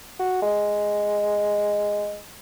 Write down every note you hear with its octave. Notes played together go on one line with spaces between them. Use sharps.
F#4
G#3